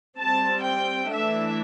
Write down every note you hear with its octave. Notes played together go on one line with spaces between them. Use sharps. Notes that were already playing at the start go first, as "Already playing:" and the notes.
G3 C4 A5
G5
E3 A3 D4 E5